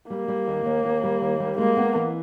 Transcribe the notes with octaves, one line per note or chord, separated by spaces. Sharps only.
G3 A#3
G3
D#2
D#2
D#2
G3
D#2
G3
G#3 A#3
B3
E3